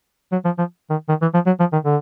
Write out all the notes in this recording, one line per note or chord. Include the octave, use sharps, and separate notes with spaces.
F#3
F3
F3
D#3
D#3
E3
F3
F#3
F3
D#3
D3